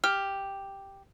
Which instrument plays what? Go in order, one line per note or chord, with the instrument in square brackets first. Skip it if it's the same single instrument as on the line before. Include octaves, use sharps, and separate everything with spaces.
[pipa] G4 [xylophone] F6